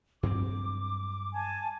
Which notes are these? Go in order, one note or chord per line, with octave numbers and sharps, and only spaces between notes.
G2 F#3 C4 D6
G#5 A5